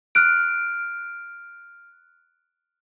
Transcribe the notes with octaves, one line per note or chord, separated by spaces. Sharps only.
F6 F#6 D7